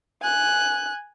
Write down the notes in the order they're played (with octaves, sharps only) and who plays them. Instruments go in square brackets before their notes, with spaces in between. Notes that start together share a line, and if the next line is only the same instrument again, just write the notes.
[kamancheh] G#5 F#6